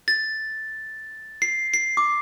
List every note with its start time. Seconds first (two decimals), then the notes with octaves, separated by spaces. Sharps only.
0.08 A6
1.42 C7
1.74 C7
1.97 D6